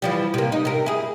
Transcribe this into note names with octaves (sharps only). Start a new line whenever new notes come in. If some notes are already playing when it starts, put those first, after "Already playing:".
E3 F3 G3
C3 A#3
D#4
C3 A#4
E4 G#4